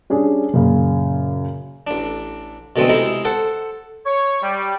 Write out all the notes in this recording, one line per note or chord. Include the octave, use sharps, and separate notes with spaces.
G3 C#4 D4 G#4
F#2 A#2 C#3
A1 D4
B2 D3 G#3 A3 C4
C3 G#3 D#4 E4
A4 C5 F#5
C#5
G3